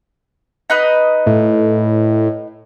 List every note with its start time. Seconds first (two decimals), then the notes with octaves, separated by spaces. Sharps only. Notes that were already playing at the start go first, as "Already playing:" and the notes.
0.70 D#4 B4 D#5
1.26 A2